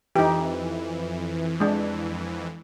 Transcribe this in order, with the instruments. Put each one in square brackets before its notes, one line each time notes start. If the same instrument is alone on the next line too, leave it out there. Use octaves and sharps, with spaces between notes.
[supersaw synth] F2 E3 [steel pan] D#4 G4
[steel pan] G#3 D4